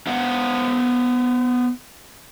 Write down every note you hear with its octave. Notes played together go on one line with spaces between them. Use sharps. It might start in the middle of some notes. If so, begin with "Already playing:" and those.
B3 C5 F5 F#5